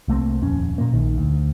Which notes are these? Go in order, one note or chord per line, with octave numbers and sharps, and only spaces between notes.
C2 A3 A#3 C4
D#1 F2 C#4
A#2 A#3
A#1 D#3
D2